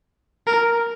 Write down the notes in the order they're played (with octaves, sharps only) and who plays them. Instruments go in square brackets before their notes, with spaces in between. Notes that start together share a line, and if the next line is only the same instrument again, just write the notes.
[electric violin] A#4